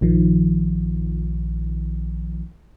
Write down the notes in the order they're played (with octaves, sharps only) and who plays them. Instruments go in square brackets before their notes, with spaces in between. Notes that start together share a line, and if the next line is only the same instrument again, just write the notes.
[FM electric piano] A#1 D#3 F3